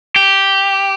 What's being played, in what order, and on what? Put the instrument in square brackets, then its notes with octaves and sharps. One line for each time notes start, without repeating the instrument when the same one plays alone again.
[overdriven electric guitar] G4